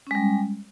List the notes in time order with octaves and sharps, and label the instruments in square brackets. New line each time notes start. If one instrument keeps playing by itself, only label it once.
[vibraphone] C#4
G#3
G3